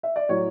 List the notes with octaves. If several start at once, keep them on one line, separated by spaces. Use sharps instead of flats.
E5
D5
A2 F#3 C#5